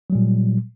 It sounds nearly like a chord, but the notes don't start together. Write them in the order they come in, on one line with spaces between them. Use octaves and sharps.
F#3 G3 A#2